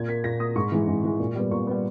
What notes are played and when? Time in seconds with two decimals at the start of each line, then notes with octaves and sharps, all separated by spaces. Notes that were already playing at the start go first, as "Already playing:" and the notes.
Already playing: A#2 G#6
0.08 A#3 B6
0.24 A#2 A#6
0.40 A#3 D#6
0.55 G#2 C#6
0.72 E3 G#3
0.88 G#2
1.04 E3 G#3
1.20 A#2
1.35 G3 B3
1.51 A#2 C#6
1.67 G3 B3